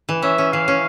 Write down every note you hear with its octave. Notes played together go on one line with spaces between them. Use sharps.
E3
C#4 E5
C#4
E3 F5
C#4